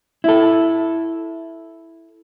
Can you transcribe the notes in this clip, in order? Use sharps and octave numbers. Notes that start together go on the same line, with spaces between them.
E4 A4